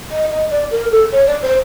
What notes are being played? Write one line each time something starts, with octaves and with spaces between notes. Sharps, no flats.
D#5
D#5
D5
A#4
A4
C#5
D5
C5